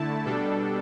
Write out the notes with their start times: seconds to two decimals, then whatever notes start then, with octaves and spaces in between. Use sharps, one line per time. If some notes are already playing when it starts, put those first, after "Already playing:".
Already playing: D3 A3 E4 A5
0.25 B2 G3 D4 A4